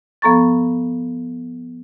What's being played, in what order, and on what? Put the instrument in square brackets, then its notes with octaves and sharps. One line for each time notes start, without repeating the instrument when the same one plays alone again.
[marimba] F3 B3 A4 A#5 C#6 A6